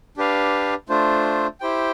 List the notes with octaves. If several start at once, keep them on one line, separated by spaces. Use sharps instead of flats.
D4 G4 B4 F5
A3 D4 F4 C5
E4 G4 C5 G5